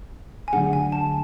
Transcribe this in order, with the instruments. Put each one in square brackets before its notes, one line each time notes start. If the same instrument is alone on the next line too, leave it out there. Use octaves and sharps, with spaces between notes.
[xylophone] G#5
[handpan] D3 F#3 A3 D4 G#4 [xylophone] F#5
[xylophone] G#5
A5